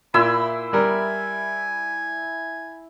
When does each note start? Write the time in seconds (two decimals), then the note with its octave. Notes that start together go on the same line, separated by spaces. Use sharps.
0.14 A#2 E4 B5 C6 E6
0.73 G3 A#4 G#5